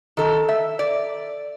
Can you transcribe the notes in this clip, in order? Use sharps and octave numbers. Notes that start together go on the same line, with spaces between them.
D#3 A4
E5
D5